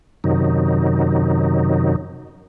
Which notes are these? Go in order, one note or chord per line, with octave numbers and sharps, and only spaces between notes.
F#2 C3 D#3 F#3 D#4